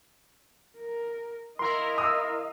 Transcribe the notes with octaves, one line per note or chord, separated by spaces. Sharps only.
A#4
E4 A#4 D#5 F5 C6
D#6 E6